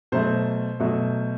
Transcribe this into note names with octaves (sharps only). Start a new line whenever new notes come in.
B2 F#3 A3 C5
B2 F#3 A3